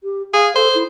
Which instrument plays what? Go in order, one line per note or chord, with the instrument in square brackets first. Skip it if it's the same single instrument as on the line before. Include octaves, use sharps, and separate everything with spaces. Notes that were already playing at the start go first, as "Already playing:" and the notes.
[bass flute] G4
[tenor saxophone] G#4 [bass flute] F5
[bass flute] A4 [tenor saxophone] C5
[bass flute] E4